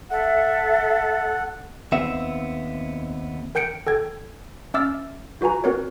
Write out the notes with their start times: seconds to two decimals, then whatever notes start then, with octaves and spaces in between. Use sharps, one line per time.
0.11 A4 E5 F#5
1.92 D#2 B3 C4 E5
3.55 A#4 G5 G6 C#7 D7
3.87 A4 G5 G#6
4.74 C#4 E5 D6 E6 F6 A6
5.41 F4 F#4 B4 G#5 A#5
5.64 C4 F#4 A#4 B4 C#5